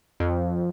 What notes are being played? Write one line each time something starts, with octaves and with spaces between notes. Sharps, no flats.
F2